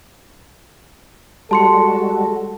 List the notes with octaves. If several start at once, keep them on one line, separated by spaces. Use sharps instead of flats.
G3 G#3 F#4 A4 A5 C6 C#7